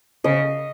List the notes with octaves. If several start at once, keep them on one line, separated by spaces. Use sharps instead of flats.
C#3 D#5